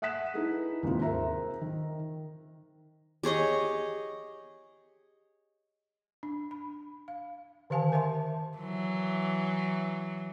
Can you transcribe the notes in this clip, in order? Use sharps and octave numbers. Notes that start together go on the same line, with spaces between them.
E5 F#5 D#6 F#6 B6 E7
D#4 E4 G#4 A4 B4
D#2 G#2 C3 F4
A#4 C5 E5 A#5
D#3
G4 G#4 C#5 D#5
D4
B5
F5
D3 D#3 G4 F5 G#5 A5
A#4 C5 E5 A5 C6
E3 F#3